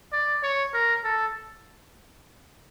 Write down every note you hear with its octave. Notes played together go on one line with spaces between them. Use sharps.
D5
C#5
A#4
A4